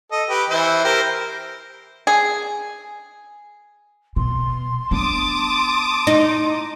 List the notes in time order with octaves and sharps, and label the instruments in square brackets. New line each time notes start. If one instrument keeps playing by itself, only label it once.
[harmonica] A4 D#5
G4 B4
E3 E4 C5
G4 A#4 C5
[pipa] G#4
[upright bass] B2 [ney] C6
[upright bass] B3 D4 [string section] A5 D6 D#6
[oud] D#4